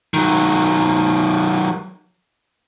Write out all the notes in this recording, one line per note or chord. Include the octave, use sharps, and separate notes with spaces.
D#3 F#3